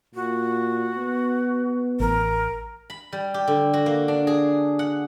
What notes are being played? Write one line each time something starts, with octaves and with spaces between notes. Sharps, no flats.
A#2 F#4
B3
A1 A#4
B5
G3
G4
D3
F#4
A#3
D4
G#4
F#5